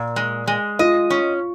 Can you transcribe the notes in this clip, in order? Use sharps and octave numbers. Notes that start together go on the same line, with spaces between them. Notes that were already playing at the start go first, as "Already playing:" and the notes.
Already playing: A#2
G#3
G#3
F4 D#5
C#4